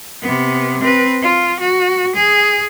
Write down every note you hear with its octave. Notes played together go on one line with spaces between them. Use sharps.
C3 B3
C4 B4
F4
F#4
G#4